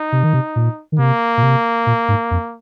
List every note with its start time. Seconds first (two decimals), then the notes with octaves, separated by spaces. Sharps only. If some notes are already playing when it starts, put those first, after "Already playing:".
Already playing: D#4
0.12 C3
0.23 D#3
0.33 C3
0.56 A#2
0.92 D#3
0.99 C3 A#3
1.37 A#2
1.43 C3
1.86 A#2
2.08 G#2
2.31 F2